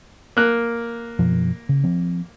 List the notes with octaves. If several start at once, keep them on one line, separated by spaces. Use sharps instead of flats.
A#3 F#6
F#2 B2 F3
C#3
F3 C4